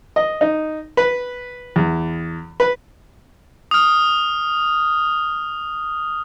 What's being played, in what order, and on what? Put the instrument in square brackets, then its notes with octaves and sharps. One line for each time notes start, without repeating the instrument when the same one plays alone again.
[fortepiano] D#5
D#4
B4
E2
B4
[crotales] D#6 F6